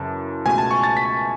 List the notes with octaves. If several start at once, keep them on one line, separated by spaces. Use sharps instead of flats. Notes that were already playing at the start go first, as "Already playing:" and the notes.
Already playing: F#2 C#3 E3 A5
C#2 B2 A3 G#5
A5
C#6
A6
B6